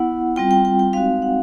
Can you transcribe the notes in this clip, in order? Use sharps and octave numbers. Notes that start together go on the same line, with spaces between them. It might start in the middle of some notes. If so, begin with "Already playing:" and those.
Already playing: B3 E4 F#5
G3 C4 F4 G5
G5
G5
G5
G#3 C4 D#4 F#4 F5
F#5